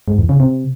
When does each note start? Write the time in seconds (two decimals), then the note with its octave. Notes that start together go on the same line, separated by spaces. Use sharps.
0.08 G#2
0.18 E2
0.29 C#3
0.40 C3